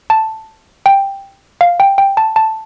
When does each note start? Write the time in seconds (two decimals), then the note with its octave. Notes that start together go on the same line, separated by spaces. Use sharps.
0.10 A5
0.86 G5
1.61 F5
1.80 G5
1.98 G5
2.17 A5
2.36 A5